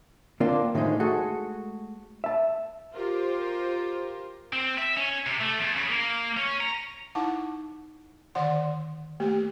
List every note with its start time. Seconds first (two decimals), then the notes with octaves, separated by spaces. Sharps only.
0.40 D3 A#3 C4 D4 F4
0.75 A2 D3 D#3 F3 G#3 D#4
1.00 G#3 A3 F#4 G#4 A4
2.24 E5 A5
2.94 F4 G4 A#4 C5
4.53 C4
4.78 E5
4.97 C#4
5.26 C3
5.41 A3
5.59 E2
5.76 C#3
5.89 A#3
6.37 C#4
6.60 A#5
7.15 D#4 E4 F#5 A5
8.35 D3 D#3 D5 F#5 C6
9.20 A3 A#3 G4